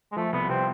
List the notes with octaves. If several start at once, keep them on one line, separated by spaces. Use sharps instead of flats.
G#3
F3 A3
C2 B3
C3 C4